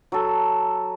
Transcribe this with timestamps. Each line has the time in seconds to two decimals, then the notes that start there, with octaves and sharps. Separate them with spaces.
0.12 F#3 A4